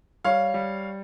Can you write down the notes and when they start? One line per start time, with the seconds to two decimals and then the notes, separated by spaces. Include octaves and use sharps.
0.24 G3 C#5 F5
0.54 G3